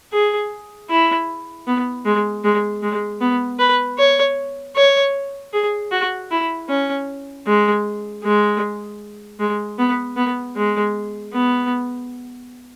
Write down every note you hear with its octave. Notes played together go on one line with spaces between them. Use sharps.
G#4
E4
B3
G#3
G#3
G#3
B3
B4
C#5
C#5
G#4
F#4
E4
C#4
G#3
G#3
G#3
B3
B3
G#3
B3